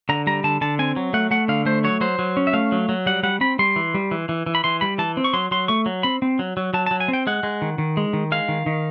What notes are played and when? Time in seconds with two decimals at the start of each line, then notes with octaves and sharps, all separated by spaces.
0.09 D3 A#5
0.27 G3 A#5
0.44 D3 A5
0.61 D3 A5
0.79 C4 G#5
0.96 F#3
1.14 A3 F#5
1.31 A3 F#5
1.48 D3 F5
1.66 A3 C5
1.84 F#3 C#5
2.01 F#3 C5
2.19 F#3
2.37 C#4
2.47 E5
2.53 A3 F5
2.72 F#3
2.89 F#3
3.06 G3 F#5
3.23 G3 F#5
3.41 C4 B5
3.59 G3 C6
3.76 E3
3.94 G3
4.11 E3
4.29 E3
4.46 E3
4.55 B5
4.64 E3 C6
4.81 G3 B5
4.98 E3 A5
5.17 C4
5.24 C#6
5.33 F#3 C6
5.51 F#3 C6
5.68 A3 C#6
5.86 F#3
6.03 C4 B5
6.22 C4
6.39 F#3
6.57 F#3
6.74 F#3 A5
6.86 A5
6.91 F#3
7.00 G#5
7.08 C4
7.13 G5
7.27 G#3 F#5
7.43 G#3
7.62 D#3
7.78 D#3
7.97 G#3
8.13 D#3
8.32 G#3 F5
8.48 D#3
8.66 D#3